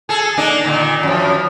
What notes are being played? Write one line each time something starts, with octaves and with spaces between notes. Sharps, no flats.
G#4 A4
A#3 D4 D#4
A#2 D3 D#3
F#2 F3